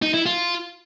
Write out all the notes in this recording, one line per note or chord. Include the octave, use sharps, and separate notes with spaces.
D#4
E4
F4